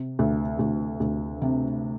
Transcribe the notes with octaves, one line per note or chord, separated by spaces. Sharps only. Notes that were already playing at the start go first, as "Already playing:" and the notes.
Already playing: C3
D2
D2
D2
C3